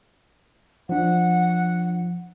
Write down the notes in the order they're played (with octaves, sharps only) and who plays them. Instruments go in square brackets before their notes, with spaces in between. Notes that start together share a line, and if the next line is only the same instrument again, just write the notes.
[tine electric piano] F3 D4 [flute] F#5